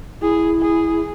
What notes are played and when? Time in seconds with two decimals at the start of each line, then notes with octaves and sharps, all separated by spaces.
0.21 E4 G#4
0.61 G#4